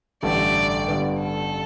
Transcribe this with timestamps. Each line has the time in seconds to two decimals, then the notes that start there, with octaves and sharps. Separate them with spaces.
0.23 A1 G2 D3 A3 D5
0.88 G2 D3 B3
1.21 A4